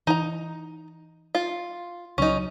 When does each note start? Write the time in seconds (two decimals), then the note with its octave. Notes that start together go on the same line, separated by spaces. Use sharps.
0.07 E3 D#4 A#5
1.35 F4
2.18 C#2 F3 F#3 C#4 D#4